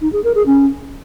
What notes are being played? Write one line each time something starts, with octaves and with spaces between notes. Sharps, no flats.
D#4
G#4
A#4
G#4
C#4